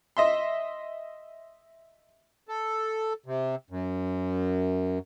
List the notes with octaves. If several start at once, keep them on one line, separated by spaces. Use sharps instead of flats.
D#5 E5 C6
A4
C3
F#2